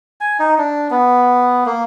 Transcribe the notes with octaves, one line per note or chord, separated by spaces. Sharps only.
G#5
D#4
D4
B3
A#3